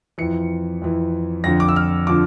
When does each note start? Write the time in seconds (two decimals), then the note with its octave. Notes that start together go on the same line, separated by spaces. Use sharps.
0.18 F2 E3 C#7
0.82 F2 E3
1.44 F2 D3 F3 A#6
1.60 D6
1.69 E6
1.76 F6
2.07 D3 F3 D6